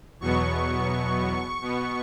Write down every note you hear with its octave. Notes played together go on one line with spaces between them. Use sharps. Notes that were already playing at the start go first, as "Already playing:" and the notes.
E2 B2 F#3 B3 C#6
B2 B3